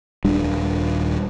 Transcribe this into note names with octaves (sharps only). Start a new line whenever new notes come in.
D#1 G3 D4